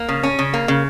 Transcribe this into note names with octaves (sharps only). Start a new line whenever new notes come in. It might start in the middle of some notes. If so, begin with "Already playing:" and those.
Already playing: A#3
C#3
C#4
C#3
A#3
C#3